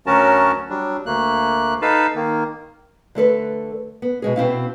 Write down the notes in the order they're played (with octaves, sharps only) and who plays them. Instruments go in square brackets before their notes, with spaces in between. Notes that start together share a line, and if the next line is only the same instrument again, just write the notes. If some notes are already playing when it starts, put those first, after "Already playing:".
[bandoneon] D2 F#3 C#4 F#4 A#4 A5
F#3 G3 D4
D2 A3 A#3 F#6
D#4 A4 B4 F5 A5
D#3 A#3
[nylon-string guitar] D3 A3 A4 B4
B3
B2 G#3 G#4
B2 C4 E4 F5